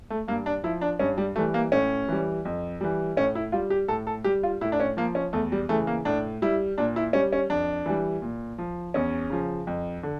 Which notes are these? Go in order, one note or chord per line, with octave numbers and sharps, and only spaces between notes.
A3
G2 A#3
D4
F3 E4
D4
G2 C#4
G3
E3 G3 A3
A#3
A2 C#4
E3 G3
F2
E3 G3
A2 C#4
E4
G3 F4
G4
A2 A4
A4
G3 G4
F4
A2 E4
D4
C#4
F3 A#3
C#4
E2 A3
G3
C#3 E3 A3
A#3
A2 D4
G3 E4
A#2 D4
E4
G3 C#4
C#4
F2 D4
E3 G3
A#2
F3
E2 C#4
C#3 F3
F2
D3